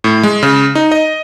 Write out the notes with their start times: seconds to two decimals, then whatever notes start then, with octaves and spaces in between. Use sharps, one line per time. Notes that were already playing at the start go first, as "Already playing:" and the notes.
0.04 A2
0.23 G#3
0.43 C#3
0.75 D#4
0.92 D#5